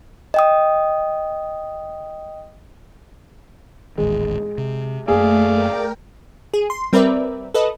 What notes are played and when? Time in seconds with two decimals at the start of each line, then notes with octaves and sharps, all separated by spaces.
0.34 D#5 G5 D#6
3.98 D#1 A1 D#3 G#3
4.58 C3
5.08 F#2 A3 A#3 G#4 D5 F5
5.52 A#4 G5
6.54 G#4
6.70 C6
6.93 G3 C4 A#4 B4 D5 E5
7.54 A4 B4 D#5